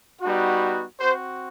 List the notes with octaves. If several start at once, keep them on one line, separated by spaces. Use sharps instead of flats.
G3 B3 D#4 F#4
C4 F#4 C5